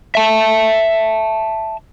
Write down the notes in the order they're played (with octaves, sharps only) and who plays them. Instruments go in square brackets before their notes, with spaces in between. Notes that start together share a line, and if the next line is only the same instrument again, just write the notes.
[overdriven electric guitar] E5 A5